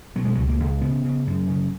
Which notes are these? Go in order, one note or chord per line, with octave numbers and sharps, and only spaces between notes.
B2 F#3
G#3
C#2 F#3
A#3
C#2
C#3 B3
C#3
F#2
C#3